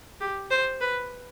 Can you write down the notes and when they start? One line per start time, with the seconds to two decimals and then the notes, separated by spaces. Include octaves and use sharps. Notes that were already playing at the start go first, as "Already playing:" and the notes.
0.21 G4
0.51 C5
0.81 B4